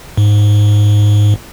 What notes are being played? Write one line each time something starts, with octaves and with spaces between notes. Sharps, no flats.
G#2